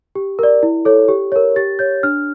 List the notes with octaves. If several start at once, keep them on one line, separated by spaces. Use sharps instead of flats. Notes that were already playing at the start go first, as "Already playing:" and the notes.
G4
A#4 D5
E4
A4 C#5
G4
A#4 C#5
G4 A6
C#5 G6
D4 F6